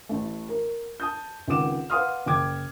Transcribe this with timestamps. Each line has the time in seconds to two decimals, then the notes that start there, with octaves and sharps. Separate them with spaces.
0.09 A1 A3
0.49 A#4
1.00 A5 D#6 G6
1.48 C#2 D#3 C4 F#5 D6 E7
1.90 B4 F5 F#5 C6 D#6 F6
2.26 F#1 G5 D6 G#6